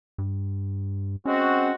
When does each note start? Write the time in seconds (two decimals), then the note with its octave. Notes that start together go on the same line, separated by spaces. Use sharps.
0.18 G2
1.26 G#3 C4 C#4 F#4